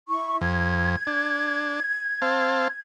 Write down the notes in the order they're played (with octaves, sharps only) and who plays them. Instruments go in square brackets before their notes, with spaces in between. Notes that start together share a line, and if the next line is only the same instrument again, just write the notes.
[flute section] E4 C#6
[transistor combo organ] F2 [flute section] G#6
[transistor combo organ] D4
C4 F5 A5